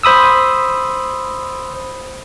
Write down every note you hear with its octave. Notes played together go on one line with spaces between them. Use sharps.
C5 B5 D#6 E6